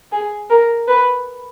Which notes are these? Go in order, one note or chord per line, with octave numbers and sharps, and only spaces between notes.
G#4
A#4
B4